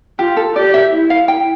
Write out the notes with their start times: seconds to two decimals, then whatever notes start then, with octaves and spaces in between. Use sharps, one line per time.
0.19 F4 G4
0.37 A4
0.55 G4 D5
0.74 E5
0.92 E4
1.10 F5
1.28 G5